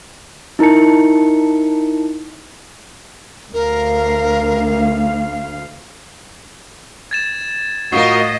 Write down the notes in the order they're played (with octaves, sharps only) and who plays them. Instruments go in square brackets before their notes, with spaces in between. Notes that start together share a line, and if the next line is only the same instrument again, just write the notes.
[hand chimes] D#4 E4 A#4 A5 C#7
[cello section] D2 F5 [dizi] A#4
[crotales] G#6 A6 E7
[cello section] A2 D#5 [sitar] D#4 F4 A#4 [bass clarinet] F#4 [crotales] C7